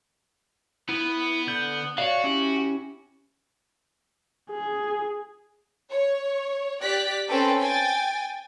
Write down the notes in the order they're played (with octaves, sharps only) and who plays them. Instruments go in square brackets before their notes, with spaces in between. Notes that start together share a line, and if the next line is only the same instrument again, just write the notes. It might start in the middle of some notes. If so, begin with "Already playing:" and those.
[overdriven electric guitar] B3 [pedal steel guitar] E4
[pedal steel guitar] D3 G6
[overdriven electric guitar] F#4 [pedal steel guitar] C#5 D5 F5
[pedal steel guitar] C#4 E4 G4
[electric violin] G#4
[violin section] C#5
G4 D5 F#6 B6
C4 C#4 A4 B4 G5
G5 G#5 A6